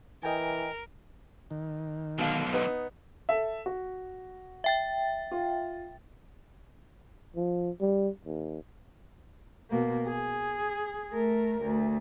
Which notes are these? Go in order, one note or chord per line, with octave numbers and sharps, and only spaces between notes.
E3 A#4 D#5 G5 G#5
D#3
B1 B2 D3 F5
B3 D#4
A4 E5
F#4
E5 G5 A6
F4
F3
G3
D#2
B2 A#3
G#4
A3 A#4
D2